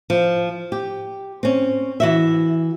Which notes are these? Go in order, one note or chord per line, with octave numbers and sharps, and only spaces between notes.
F3
G4
C4 C#4
E3 F#4 E5